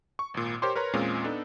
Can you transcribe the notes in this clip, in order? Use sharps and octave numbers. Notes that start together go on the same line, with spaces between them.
C#6
G#1 A#2
G4 A#4 C5 C#5 C6 D6
A#4 B4 C#5 A#5 C6
E2 A#2 G#3 C4 C#4 F4
B3 D4 D#4 A4